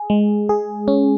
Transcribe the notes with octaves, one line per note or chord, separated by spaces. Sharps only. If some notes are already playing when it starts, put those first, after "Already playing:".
Already playing: G#4
G#3
G#4
C#4